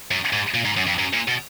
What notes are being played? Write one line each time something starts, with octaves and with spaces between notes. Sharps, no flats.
F#2
G#2
A#2
G#2
F#2
F2
F#2
A#2
B2